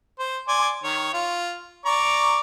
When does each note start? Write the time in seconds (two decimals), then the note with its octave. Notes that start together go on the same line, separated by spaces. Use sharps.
0.19 C5
0.48 D5 G#5 C6
0.83 D#3 C#5
1.13 F4
1.85 D5 A#5 C#6